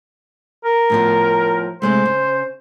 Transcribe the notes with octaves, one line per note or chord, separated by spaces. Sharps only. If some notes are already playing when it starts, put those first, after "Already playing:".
A#4
A2 F3 B3
C3 G#3 A3 C5
C#3